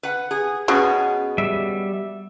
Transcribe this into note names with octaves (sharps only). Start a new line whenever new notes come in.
B4 F#5
G#4
B2 B3 C#4 G#4
G3 E5